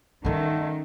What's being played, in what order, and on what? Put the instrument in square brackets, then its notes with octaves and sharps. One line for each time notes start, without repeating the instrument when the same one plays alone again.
[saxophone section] D3 A3 [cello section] D#3 [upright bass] G3 C#4